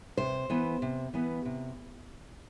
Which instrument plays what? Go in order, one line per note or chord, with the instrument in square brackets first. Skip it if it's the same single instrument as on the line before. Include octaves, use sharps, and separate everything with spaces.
[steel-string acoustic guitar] C3 C5
E3 B3
C3
E3 B3
C3